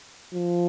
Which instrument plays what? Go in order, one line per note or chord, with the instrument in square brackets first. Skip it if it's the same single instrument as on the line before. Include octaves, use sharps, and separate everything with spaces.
[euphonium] F3